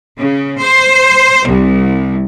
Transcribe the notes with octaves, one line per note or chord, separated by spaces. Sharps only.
C#3
C5
C2